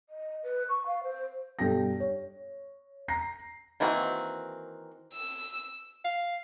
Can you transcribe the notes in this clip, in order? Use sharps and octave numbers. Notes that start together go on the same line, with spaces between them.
D#5
B4
C#6
F5
C5
G2 B2 A4 G5 A#6
C#5
A#5 A#6 C7
D#3 E3 A#3 C4 F#4
E6
F5